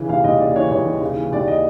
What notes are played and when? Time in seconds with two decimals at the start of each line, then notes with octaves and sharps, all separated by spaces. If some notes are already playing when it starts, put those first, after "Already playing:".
Already playing: C#3 E3
0.09 D#2 F5
0.24 D#2 D#5
0.39 C#3 D5
0.56 E3 C#5
0.71 D#2 C#5
0.85 D#2
1.01 C#3
1.16 E3
1.32 D#2 D5
1.48 D#5